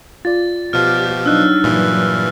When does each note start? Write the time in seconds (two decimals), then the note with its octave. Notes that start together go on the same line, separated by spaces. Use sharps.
0.25 F4 D5 A6
0.73 B2 F3 G4 F6
1.26 F#3 D4 D#4 E6 F#6
1.64 G2 A#2 E3